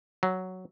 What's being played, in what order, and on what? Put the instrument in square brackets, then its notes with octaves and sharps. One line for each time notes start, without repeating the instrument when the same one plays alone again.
[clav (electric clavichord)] F#3